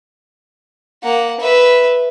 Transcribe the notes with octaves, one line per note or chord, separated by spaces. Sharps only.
A#3 F#5
B4 E5